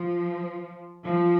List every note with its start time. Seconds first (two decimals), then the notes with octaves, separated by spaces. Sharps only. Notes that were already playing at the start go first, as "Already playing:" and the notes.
Already playing: F3
1.05 F3